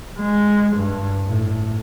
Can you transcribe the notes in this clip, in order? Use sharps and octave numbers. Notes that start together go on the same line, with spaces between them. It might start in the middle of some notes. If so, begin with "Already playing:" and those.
G#3
G2
A2